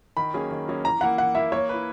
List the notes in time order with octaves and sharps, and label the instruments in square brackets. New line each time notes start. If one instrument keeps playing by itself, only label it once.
[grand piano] D#3 [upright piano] B5
[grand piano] F#3 A#3 C#4 G#4
D#3
F#3 A#3 C#4 G#4
[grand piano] E3 [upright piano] A#5
[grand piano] A#3 E4 [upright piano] F#5
[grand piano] E3 [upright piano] F#5
[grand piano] A#3 E4 [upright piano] E5
[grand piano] A#3 [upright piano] C#5
[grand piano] E4 B4